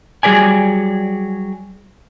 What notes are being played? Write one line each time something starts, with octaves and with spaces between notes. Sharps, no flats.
F#3 G3 G#4 B4 D5 G#5